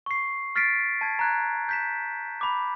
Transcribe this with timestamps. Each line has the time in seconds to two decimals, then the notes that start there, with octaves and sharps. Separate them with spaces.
0.06 C#6 C7
0.56 F6 A6 B6 C7 D7
1.01 A5 G#6
1.19 A#5 F#6 G#6
1.69 G6 B6 E7
2.41 B5 D6